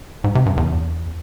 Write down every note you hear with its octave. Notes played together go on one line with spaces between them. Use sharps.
G#2
C3
G2
E2